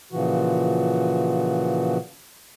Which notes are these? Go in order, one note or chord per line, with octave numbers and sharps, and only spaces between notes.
A#2 C#3 E3 F3 F#4